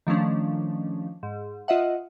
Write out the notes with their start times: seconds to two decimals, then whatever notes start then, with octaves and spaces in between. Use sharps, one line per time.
0.07 D#3 F3 A3 C#4 D4
1.23 G#2
1.68 F4 D#5 E5 F#5